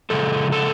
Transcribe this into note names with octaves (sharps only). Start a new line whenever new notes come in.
C#3 F3 G#3 A4
A4